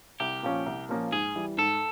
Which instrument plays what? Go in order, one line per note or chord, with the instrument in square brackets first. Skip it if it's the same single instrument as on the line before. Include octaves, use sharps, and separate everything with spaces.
[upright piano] C2 [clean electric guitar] G4
[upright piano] A#2 F3 A#3 C#4
C2
A#2 F3 A#3 C#4
[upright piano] G#2 [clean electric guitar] G#4
[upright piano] E3 G3
[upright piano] G#2 [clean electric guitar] A4